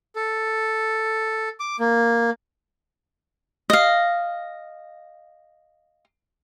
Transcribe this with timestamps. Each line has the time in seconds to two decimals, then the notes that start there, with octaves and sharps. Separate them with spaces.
0.16 A4
1.60 D6
1.79 A#3
3.70 D#5 F5